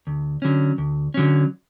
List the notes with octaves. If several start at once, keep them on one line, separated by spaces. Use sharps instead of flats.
D2
D3 F#3 C#4
D2
D3 F#3 C#4